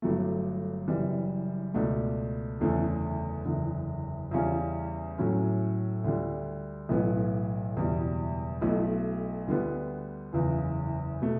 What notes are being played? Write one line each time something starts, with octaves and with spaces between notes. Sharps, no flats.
G1 G2 F#3 A3
F#1 F#2 E3 G3
C#2 B2 A3 D4
F#1 E2 D3 A3 C#4
F#1 E2 D3
E2 C#3 G3 C#4 E4
A2 F#3 C#4 E4
D2 D3 G3
B1 A2 E3 B3 E4
F#1 E2 B2 G3
B1 B2 A3 E4
D2 D3 G3 B3
F#1 E2 C#3 E3
B2 A3